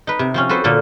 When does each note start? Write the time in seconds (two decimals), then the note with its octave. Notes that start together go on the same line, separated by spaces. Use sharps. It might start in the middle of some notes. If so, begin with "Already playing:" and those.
0.07 D#4 B4
0.19 C3
0.34 F3 C4 C#4
0.49 F#4 A4 B4 C5
0.64 A#2 D3 A#3 A4